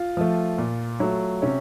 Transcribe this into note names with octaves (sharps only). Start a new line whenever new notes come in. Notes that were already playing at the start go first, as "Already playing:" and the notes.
Already playing: F4
F3 A3
A#2
F#3 A3
C3 C#4